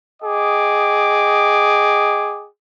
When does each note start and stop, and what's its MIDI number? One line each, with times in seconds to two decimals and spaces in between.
0.23 2.47 68
0.23 2.47 75
0.23 2.47 79
0.23 2.47 86